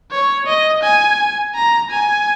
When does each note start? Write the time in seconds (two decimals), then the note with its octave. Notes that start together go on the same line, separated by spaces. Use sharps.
0.12 C#5
0.47 D#5
0.83 G#5
1.55 A#5
1.91 G#5